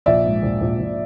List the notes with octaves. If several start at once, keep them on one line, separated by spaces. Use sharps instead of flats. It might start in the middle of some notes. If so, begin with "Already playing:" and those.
A#1 D5 E5
G#2
A#1
A#1
A#1